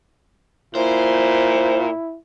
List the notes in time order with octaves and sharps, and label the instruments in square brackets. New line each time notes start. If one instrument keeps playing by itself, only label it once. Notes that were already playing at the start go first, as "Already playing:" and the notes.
[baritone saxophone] A#2 [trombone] E4 [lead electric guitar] C5